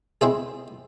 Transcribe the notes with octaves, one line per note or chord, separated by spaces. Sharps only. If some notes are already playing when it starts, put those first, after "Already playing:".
G#3 C4 E4 G#4